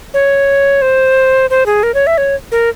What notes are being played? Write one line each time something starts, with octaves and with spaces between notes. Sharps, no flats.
C#5
C5
C5
G#4
A#4
C#5
E5
C#5
A#4